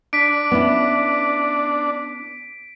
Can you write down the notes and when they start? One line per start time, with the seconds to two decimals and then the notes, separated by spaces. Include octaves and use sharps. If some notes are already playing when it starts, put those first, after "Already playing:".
0.13 D4 B6 D7
0.51 B3 C#4 E4